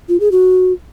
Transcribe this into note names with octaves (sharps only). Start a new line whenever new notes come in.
F4
G#4
F#4